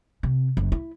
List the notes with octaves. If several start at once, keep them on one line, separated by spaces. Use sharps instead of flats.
C3
F#1
E4